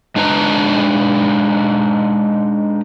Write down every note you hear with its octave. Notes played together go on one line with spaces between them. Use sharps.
G#3 D4 D#4 B4 G5 A#5